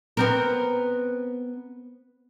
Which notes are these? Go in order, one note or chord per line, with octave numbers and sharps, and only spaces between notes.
B3 C4 A#4